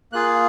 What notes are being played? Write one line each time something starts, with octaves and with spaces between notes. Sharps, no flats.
A#3 F4 G#4 F#6